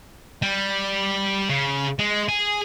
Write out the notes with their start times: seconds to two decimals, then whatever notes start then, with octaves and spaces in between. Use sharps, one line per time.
0.42 G3
1.49 C#3
1.99 G#3
2.29 G#4